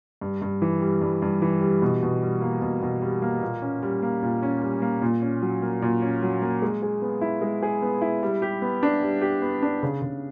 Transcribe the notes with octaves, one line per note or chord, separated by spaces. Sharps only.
G2
G2
E3
G3
G2
G2
E3
G3
B2
B2
G3
A#3
B2
B2
G3
A#3
A#2
C#4
G3
A#3
A#2
C#4
G3
A#3
A#2
C#4
F#3
A#3
A#2
C#4
F#3
A#3
G#3
G#4
B3
E4
G#3
G#4
B3
E4
G3
G4
B3
D4
G3
G4
B3
D4
C#3
C#3